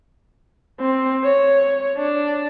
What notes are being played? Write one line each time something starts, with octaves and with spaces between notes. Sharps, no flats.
C4
C#5
D4